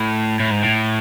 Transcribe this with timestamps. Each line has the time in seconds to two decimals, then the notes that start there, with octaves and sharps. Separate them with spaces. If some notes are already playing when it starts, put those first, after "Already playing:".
Already playing: A2
0.40 A2
0.51 G#2
0.63 A2